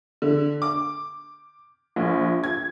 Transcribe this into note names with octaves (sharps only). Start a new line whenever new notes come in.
D3
D6
A#1
G#6